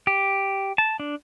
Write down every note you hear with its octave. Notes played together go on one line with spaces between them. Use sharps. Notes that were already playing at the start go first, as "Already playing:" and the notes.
G4
A5
D4